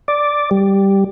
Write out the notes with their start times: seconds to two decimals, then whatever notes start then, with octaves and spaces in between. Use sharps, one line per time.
0.08 D5
0.51 G3